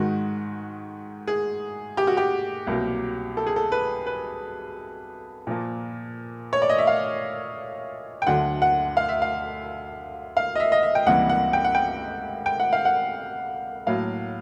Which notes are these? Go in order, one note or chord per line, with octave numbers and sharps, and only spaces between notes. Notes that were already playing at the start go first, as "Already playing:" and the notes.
Already playing: G#2 D#3 G#3 F#4
G#4
G4
F#4
G4
C2 B2 F#3 A#3
A4
G#4
A4
B4
B4
A#2 F3 A#3
C#5
D5
D#5
E5
F5
G5
D2 D3 F#3 A3 F#5
F#5
F5
E5
F5
F5
D#5
E5
D#5
E5
G5
C#2 C3 E3 G3 A#3 F#5
F#5
G5
F#5
G5
G5
F#5
F5
F#5
A2 F#3 A#3 F5